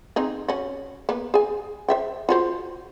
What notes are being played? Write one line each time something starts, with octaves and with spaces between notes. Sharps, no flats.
C4 D#4 G#4
C#4 F#4
A#3 B3
G#4 G#5
C5 E5 G5
F4 F#4 C5